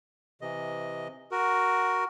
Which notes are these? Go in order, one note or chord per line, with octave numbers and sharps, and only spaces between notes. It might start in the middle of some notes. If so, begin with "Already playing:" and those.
C3 E3 D#5
F#4 A#4